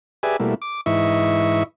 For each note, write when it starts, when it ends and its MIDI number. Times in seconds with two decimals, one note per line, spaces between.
0.23 0.37 67
0.23 0.37 68
0.23 0.37 71
0.23 0.37 74
0.23 0.37 76
0.23 0.37 80
0.40 0.55 47
0.40 0.55 55
0.40 0.55 57
0.40 0.55 58
0.40 0.55 64
0.62 0.81 86
0.86 1.63 44
0.86 1.63 52
0.86 1.63 64
0.86 1.63 75
0.86 1.63 76
0.86 1.63 85